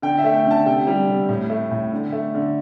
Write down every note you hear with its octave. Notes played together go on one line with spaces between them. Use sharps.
D3 G5
E5
A3
G5
D3
A5
C3 G5
G3
C3
A2
A3
A2
D3
A3
D3